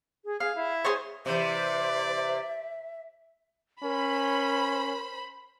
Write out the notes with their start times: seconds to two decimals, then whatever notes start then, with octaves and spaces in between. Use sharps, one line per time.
0.25 G#4
0.40 G#4 F5
0.55 E4
0.85 G#4 C5 C#5
1.26 C3 E3 C5 D5 E5
3.83 C#4 A#4 C5 B5